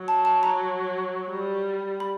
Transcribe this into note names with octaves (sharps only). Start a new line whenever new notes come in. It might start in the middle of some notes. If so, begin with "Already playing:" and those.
Already playing: F#3
A5
A5
A#5
G3
B5